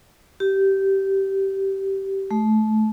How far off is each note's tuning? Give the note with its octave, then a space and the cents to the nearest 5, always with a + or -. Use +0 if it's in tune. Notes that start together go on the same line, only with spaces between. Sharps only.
G4 -15
A3 -25